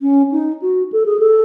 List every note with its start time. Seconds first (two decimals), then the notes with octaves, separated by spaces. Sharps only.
0.01 C#4
0.31 D#4
0.61 F#4
0.92 A4
1.05 G#4
1.19 A4